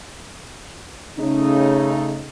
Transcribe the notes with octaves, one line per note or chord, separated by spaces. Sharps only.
C#3 A3 D#4